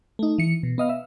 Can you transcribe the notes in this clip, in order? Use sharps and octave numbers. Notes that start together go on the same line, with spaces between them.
A3 D#4
E3 C#7
B2
B3 D#5 F5
E5